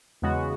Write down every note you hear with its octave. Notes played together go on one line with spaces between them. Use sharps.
E2 C#3 G#3 B3 F#4